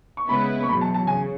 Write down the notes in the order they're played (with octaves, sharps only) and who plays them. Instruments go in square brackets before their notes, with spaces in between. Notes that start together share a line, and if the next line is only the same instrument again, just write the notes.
[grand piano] C#6
[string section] C#3 G#3 B3 E4 B4 [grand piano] B5
[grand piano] C#6
[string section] E2 B2 F#3 [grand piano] B5
[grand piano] A5
A5
[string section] C#3 [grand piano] G#5